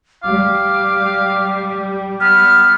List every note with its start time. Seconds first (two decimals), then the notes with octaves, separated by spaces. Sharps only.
0.23 G3 F5 D6
2.20 B3 F6